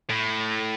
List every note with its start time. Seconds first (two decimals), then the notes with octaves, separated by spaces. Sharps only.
0.10 A2